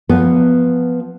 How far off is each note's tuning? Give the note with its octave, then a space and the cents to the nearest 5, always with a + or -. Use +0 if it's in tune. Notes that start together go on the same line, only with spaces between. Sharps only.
F3 +0 B3 +0